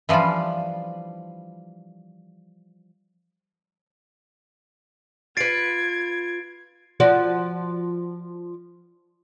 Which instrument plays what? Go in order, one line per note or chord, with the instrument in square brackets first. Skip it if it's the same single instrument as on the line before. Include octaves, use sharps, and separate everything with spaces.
[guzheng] E3 F3 G3 D4 F4
[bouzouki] F4 B4 [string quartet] G#6 [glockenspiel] A6 C7 D7
[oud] F3 F#4 D5